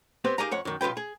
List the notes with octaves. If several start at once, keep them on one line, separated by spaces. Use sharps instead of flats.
B3 C4 G4 B4
D#4 G4 G#4 A#4 F5 A#5
F2 C#5 F#5
F#2 D#3
B1 F4 G4 B4 G5
G#4